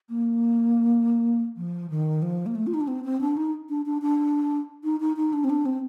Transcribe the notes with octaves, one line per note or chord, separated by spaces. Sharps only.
A#3
F3
D#3
F3
A#3
A3
F4
D#4
D4
C4
C4
D4
D#4
D4
D4
D4
D#4
D#4
D#4
D4
C4
D4
C4